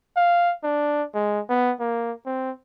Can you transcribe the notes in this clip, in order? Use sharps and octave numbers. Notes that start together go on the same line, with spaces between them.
F5
D4
G#3
B3
A#3
C4